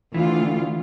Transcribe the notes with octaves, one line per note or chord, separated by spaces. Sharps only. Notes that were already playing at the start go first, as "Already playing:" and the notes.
D2 E3 F4